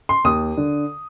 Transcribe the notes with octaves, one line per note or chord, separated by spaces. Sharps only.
C6
D#2 D#6
D3